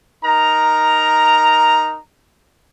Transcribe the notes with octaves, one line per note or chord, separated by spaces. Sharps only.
D#4 A#4 A#5